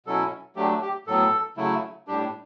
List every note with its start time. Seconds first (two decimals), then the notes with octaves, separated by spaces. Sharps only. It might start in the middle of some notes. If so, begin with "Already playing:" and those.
0.06 B2 F#3 C#4 E4 A4
0.56 F#3 A3 D4 G4
0.81 G4
1.07 A2 F#3 B3 A4
1.57 C#3 F#3 A3 E4
2.07 A2 G3 D4 G4